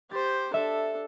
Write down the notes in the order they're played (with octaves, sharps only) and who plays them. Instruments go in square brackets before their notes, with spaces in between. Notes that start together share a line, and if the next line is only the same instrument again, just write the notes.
[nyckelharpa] G4 C5 [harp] A6
[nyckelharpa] D4 A4 [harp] E5